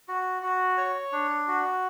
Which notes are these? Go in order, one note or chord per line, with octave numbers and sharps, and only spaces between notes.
F#4
F#4
C#5
D4
F#4